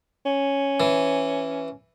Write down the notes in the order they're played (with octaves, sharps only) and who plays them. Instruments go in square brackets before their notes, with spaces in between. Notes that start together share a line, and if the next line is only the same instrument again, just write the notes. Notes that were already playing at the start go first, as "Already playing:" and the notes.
[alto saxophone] C#4
[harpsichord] E3